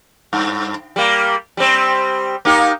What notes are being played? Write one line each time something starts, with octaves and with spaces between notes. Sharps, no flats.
G2
G3 A#3
G3 C4
A#3 D#4 G4